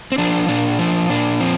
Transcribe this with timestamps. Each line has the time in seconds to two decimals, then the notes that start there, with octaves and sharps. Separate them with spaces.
0.12 C4
0.18 F3 D4
0.49 A#2 D4
0.79 F3
1.09 A#2 D4
1.40 F3 C4